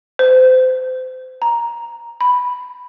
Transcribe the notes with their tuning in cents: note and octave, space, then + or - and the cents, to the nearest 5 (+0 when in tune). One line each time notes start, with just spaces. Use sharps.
C5 -30
A#5 +5
B5 +0